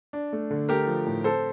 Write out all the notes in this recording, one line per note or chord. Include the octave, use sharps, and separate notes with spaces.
D4
A3
D3
A3 G4 A#4
F3
A2
C4 A4 C5